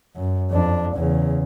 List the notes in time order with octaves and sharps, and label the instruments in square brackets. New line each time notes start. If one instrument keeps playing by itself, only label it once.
[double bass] F#2
F2 D4
E2 C#3